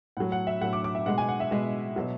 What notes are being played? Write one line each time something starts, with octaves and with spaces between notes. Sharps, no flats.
A2 F#3 F#5
F#5
E5
A2 F#3 F#5
D6
D6
E5
B2 G#3 F#5
G#5
F#5
E5
B2 G#3
B2 F#3